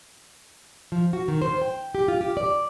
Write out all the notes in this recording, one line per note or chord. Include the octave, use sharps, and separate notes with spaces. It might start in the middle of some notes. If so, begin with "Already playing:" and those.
F3
F#4
D#3
C5
G5
G4
F4
G4
D5